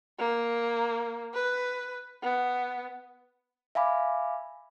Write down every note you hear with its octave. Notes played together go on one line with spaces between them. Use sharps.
A#3
B4
B3
E5 F5 G#5 B5 D6